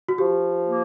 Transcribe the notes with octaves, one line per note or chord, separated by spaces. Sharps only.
F#4
F3 G4
A#3